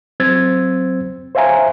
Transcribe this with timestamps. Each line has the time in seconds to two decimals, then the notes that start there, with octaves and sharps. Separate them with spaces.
0.20 F#3 C4 C5 E6 G#6 A6
1.35 C5 C#5 E5 F5 G#5 A#5